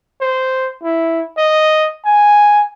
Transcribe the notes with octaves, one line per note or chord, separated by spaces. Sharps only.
C5
E4
D#5
G#5